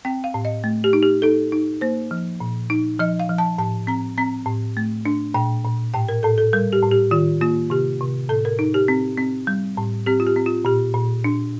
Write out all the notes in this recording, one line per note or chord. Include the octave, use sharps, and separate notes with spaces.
C4 G5
F5
A2
D#5
A3
G4
D#4
G4
D#4 A4
D#4
A#3 C5
F3
A#2
D#4
F3 D#5
F5
F3
A5
A2 A5
C4 A#5
C4 A#5
A2
A3
D4
A#2 G5
A#2
A2 G5
A#4
A2 A4
A4
G3 A#4
G4
A2
G4
D#3 F4
A#3 F4
C3 G4
C3
A2 A4
A#4
D#4
G4
C4
C4
G3
A2
C4 G4
F4
G4
C4
F4
A#2 G4
A#2
D4